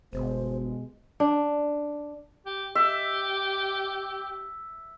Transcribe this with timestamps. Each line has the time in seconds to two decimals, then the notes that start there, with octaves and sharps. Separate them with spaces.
0.13 G1 B2 G#3 C5
1.20 D4
2.46 G4
2.75 G4 E5